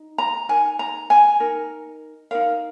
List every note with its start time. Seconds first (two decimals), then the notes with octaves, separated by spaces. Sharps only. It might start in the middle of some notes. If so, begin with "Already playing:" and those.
Already playing: D#4
0.18 A#5
0.49 D#4 A#4 G#5
0.79 A#5
1.10 G#5
1.40 D#4 A#4
2.31 D#4 A#4 F5